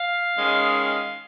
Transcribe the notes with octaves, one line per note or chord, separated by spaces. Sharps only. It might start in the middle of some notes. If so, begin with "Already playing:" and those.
Already playing: F5
D#3 G#3 C#4